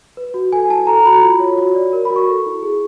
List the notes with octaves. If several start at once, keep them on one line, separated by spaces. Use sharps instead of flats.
B4
F#4
A4 G#5
E4 A5
A4 A#5
F#4 B5
F4
C#5
F#4
D5
A#4
B5
F#4
C#6
A4
E4
G#4